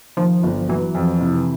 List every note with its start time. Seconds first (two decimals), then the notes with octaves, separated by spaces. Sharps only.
0.17 D#3 F3
0.43 G1
0.69 E3 F#3
0.95 F2
1.21 C3